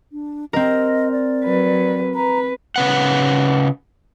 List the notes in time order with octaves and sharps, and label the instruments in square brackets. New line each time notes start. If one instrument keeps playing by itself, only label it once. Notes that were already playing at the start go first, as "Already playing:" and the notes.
[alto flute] D4
[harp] C4 A#4 [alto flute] D#5
[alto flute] D5
[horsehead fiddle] F#3 B4
[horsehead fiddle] B4 [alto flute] A#5
[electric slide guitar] C#3 B4 F#5